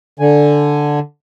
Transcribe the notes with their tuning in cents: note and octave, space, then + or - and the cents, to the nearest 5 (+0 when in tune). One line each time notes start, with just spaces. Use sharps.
D3 +0 G#5 +0